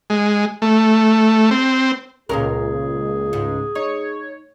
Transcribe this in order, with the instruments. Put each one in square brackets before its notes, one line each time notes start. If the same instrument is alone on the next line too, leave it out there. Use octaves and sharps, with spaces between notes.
[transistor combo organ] G#3
A3
C4
[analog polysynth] C#2 [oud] A#2 C#4 A#4 [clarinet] G#4
[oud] G#2
[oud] D#4 [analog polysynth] C#5